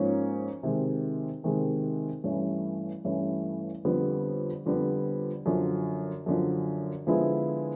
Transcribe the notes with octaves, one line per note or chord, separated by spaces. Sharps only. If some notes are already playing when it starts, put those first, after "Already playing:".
Already playing: G#2 F3 A#3 C#4
C3 D#3 G#3
C3 D#3 G#3
G2 E3 A3 C#4
G2 E3 A3 C#4
F2 D3 G3 B3
F2 D3 G3 B3
F#2 D3 F3
F#2 D3 F3
D3 F3 G#3 B3 E4